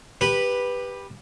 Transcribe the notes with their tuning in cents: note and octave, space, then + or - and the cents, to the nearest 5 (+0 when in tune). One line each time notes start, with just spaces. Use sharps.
G4 +15 B4 -5